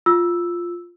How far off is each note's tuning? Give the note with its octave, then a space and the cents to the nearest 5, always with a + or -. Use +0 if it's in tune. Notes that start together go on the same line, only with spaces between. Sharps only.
F4 +0 E6 +0